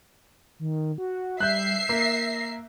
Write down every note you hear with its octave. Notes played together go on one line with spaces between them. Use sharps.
D#3
F#4
G3 E5 F#6 G6 C7
A#3 A#6